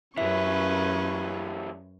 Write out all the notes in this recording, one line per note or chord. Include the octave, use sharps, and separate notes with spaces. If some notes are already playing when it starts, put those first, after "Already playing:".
F#2 E3 G3 C#4 B4 E5 C#6